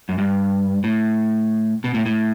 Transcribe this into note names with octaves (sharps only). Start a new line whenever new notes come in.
F#2
G2
A2
B2
A2
A2